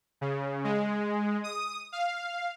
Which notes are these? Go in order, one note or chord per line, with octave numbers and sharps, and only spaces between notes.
C#3
G#3
D#6
F5